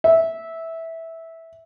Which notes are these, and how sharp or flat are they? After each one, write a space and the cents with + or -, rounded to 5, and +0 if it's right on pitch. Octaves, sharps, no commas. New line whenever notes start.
E5 -10